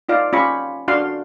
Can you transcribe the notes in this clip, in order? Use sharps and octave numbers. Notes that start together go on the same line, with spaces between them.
D#4 F4 D5 F5
C#4 F4 G4 B5 C#6
D4 F#4 F5 C6